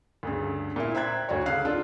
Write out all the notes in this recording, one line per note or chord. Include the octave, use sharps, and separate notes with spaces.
D2 G2 C#3
A#2 E4
C5 E5 G5 A#5 F#6 G#6
D2 F#4 C#5
C#2 C#3 F5 F#6
C#3 D4 F4 A4